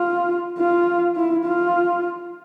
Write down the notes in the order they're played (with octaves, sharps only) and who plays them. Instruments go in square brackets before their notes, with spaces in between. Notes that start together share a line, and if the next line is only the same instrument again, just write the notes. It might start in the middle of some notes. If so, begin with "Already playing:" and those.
Already playing: [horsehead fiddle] F4
F4
E4
F4